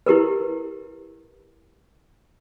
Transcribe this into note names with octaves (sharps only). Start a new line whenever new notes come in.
E4 G4 A#4 B4